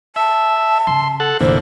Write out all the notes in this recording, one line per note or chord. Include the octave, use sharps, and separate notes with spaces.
E5 A5
C#3 C#4 C6
A4 F#5
F1 A#2 D3 E3 C5